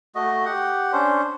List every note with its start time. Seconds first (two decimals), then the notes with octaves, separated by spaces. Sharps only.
0.15 A3 F#4 D#5
0.45 G4 F#5
0.92 C#4 D4 C5